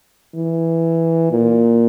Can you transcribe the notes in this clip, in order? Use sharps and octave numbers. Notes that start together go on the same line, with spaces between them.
E3
A#2